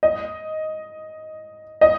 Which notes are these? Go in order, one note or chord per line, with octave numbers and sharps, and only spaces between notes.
D#5
D#5